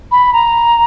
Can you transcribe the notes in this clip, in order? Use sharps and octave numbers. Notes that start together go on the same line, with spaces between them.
B5
A#5